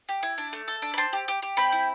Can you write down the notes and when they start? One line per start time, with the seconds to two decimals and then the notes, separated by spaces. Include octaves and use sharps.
0.09 G4
0.23 E4
0.38 D4
0.53 A3
0.68 A4
0.82 D4
0.94 B5
0.98 C4 A5 C6
1.13 G4
1.28 G4
1.42 G4
1.57 C4 G5 B5
1.72 E4